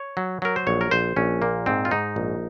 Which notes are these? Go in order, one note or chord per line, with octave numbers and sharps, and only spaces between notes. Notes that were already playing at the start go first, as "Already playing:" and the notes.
Already playing: C#5
F#3
F#3 A#4
C5
A#1 C#5
A#4
A#1 C5
A#1 C#4
A#2 A#3
G#2 C4
F4
G#2 D#4
A#1